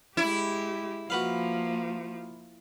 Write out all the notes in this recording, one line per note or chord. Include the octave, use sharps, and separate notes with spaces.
G#3 E4 G4
F3 A#3 F#4 B4 F5